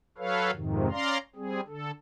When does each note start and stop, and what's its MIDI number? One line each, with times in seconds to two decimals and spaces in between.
0.18 0.51 54
0.18 0.51 69
0.18 0.51 71
0.18 0.51 73
0.18 0.51 77
0.52 0.89 41
0.52 0.89 44
0.52 0.89 48
0.52 0.89 51
0.91 1.18 61
0.91 1.18 74
0.91 1.18 77
0.91 1.18 82
0.91 1.18 84
1.36 1.61 55
1.36 1.61 60
1.36 1.61 68
1.67 1.91 50
1.67 1.91 69